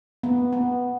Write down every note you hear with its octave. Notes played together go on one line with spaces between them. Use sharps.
B3
B3